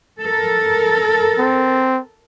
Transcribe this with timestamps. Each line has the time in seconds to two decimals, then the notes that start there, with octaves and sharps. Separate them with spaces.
0.21 A4 A#4
1.38 C4